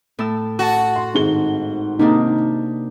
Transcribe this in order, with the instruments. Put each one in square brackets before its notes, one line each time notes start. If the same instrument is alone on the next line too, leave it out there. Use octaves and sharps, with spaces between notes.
[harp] A2 A5 E6
[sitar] F#4 [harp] A4 A5
[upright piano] C6
G#1 G#2 G7
[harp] C3 A#3 D4 [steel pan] D#4